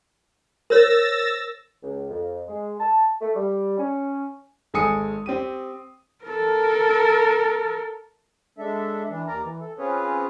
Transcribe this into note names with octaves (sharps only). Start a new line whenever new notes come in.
A#4 C5 C#5 E6 A6 A#6
C#2
F2
G#3
A5
A3
G3
C#4
G#1 G#3 A4 G#5 D#6 C#7
C4 G4 D#7
A4 A#4
G#3 D4 A4 E5
E3 D4
D#2 A#4 D5 A#5
E3
A4
C4 C#4 F4 G#4 B4 C#5